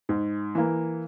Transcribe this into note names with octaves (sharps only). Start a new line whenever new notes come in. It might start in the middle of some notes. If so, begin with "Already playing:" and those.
G#2
E3 A#3